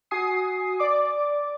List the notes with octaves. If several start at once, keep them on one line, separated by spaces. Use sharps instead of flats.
F#4 G#5 D#6 C7
D5 D6